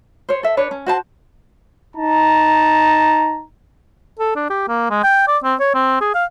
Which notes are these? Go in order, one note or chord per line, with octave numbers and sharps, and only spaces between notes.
C5 C#5
A4 E5
D4 B4 C#5
C#4
F#4 C5 A5
D#4 A5 A#5
A4
D4
G4
A#3
G#3
G5
D5
C4
C#5
C4
G#4
F5